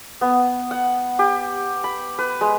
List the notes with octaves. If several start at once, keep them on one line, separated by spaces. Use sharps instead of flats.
B3
F#5
G4
B5
B4
G#3